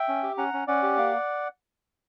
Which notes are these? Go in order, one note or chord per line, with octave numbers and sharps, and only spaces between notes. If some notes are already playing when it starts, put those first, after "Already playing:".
Already playing: E5 G5
C#4
G4
C#4 F#5 A#5
C#4
C#4 D5 F#5
G4
A#3